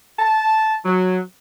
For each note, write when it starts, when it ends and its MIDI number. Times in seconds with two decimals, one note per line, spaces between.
0.19 0.76 81
0.85 1.20 54